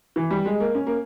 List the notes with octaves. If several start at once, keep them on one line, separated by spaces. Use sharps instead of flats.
E3
G3
G#3
A#3
C#4
A#3